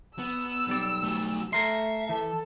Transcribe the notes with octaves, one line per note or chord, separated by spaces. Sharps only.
B3 E6
B1 G3 D5
A3 F#4
A3 A#4 E5 C6
E3 A4